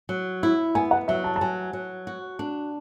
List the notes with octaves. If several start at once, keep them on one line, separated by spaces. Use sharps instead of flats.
F#3
E4
B3 G#5
F#5
F#3 E5
A5
A5
F#3 G#5
F#3
F#4
D4